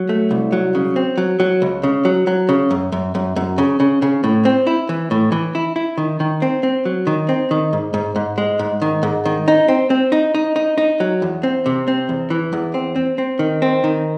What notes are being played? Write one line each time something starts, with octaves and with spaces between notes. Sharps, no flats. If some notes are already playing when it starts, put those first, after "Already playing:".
Already playing: F#3
A3
C2
F#3
C#3
C4
F#3
F#3
C#2
C#3
F#3
F#3
C#3
F#2
F#2
F#2
F#2
C#3
C#3
C#3
A2
C4
E4
E3
A2
E3
E4
E4
D#3
D#3
C4
C4
F#3
D#3
C4
D#3
G#2
G#2
G#2
G#3
G#2
D#3
G#2
D#3
D#4
C4
C4
D#4
D#4
D#4
D#4
F#3
E2
C4
C3
C4
E2
E3
E2
C4
C4
C4
D#3
C4
D#3